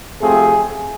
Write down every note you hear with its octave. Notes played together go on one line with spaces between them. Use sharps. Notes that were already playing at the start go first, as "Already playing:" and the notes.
C3 F3 A3 C4 G#4